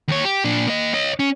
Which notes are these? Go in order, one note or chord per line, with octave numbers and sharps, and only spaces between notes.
D#2 C#5
G4
A#2 D4
A#3 D#5
C#5 D#5
C#4